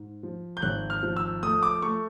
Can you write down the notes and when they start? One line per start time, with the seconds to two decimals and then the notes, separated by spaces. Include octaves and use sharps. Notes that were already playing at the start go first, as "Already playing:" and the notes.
Already playing: G#2
0.23 F3
0.57 G6
0.62 G#1 F#6
0.90 F6
1.03 F3
1.17 E6
1.43 A3 D#6
1.63 D6
1.82 A3 C#6